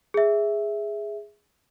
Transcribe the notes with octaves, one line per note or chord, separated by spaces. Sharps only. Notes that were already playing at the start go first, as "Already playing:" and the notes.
G#4 E5